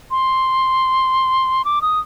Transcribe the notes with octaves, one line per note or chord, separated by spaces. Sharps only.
C6
D6
D#6